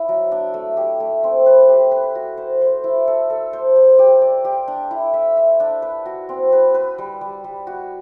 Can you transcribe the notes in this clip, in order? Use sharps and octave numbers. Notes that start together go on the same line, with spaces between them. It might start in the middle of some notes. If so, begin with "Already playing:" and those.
Already playing: E4
F#3
D4
A3
G4
A3
C4
B4
G4
B4
F#4
C5
C5
E4
A4
A4
C5
C5
G4
D5
G4
D4
E4
E5
E5
D4
B4
F#4
C4
B4
B4
G3
G3
G3
F#4